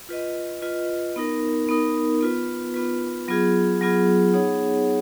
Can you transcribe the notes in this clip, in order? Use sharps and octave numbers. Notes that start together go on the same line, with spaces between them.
F4 B4 D#5
F4 B4 D#5
B3 D#4 A#4
B3 D#4 A#4
B3 F4 B4
B3 F4 B4
F#3 B3 F4 G#4
F#3 B3 F4 G#4
B3 D#4 G#4 C#5 F#5